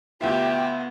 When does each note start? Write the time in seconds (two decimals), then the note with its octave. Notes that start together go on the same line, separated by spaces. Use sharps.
0.21 D2 B3 E4 F4 G4 E5 G5